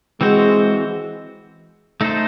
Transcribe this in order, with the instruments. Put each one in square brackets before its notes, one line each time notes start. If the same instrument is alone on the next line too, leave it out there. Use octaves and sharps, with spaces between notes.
[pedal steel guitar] E3 C4 F#4 C5 [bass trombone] G#3
[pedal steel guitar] A3 D#4 A4 C5